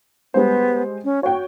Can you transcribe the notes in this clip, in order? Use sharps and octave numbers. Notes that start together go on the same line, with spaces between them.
G3 G#3 B3 C5
C#4
F#4 C#5 G5